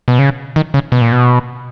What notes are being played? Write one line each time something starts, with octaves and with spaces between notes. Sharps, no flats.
B2
C#3
D#3
C#3
B2
A#2
B2